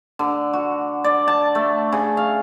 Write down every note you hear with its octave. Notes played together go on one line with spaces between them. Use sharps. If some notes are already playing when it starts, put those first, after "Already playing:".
D3
F#4
D5
A5
A3
C#3
F5